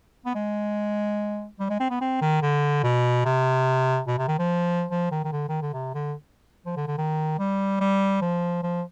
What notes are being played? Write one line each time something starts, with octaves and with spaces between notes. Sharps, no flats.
B3
G#3
G3
G#3
C4
B3
C4
D#3
D3
B2
C3
B2
C3
D#3
F3
F3
D#3
D#3
D3
D#3
D3
C3
D3
F3
D3
D3
D#3
G3
G3
F3
F3